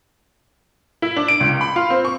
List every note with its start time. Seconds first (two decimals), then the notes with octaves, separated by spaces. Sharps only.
1.02 E4
1.16 D4
1.28 D7
1.40 C#2
1.61 B5
1.76 F4
1.90 C4
2.05 C#6